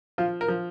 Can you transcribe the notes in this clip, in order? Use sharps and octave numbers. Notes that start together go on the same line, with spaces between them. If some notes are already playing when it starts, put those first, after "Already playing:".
F3 F4
A#4
F3